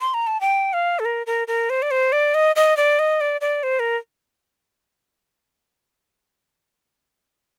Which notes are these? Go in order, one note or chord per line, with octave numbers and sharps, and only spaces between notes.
C6
A#5
A5
G5
F5
A4
A#4
A#4
A#4
C5
D5
C5
D5
D#5
D#5
D5
D#5
D5
D5
C5
A#4